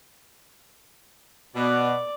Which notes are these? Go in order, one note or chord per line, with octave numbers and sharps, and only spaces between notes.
B2 D5